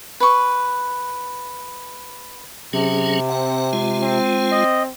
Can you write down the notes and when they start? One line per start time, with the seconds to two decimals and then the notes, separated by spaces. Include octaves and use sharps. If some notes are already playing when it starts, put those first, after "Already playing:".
0.20 B4 C#6
2.73 C3 F#3 C#4 G#4
3.29 C4 F#5
3.73 G#3 F4
4.03 C4
4.52 D#5